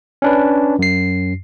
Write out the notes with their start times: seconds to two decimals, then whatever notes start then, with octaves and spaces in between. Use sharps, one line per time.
0.22 C#4 D4 B4
0.79 F#2 C7